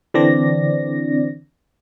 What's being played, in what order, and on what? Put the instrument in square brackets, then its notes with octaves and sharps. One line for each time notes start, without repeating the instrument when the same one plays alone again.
[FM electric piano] D3 E3 C4 D4 D5 A#6